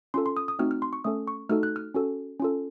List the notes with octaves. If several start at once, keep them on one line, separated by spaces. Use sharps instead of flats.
C#4 F4 A4 C6
C6
D#6
D#6
A3 C4 D#4 F#4 F6
F6
C6
C#6
A3 C#4 A4 D#6
C#6
A3 D#4 F#4 A4 F6
F#6
F6
C#4 F#4 A4
C#4 F4 A4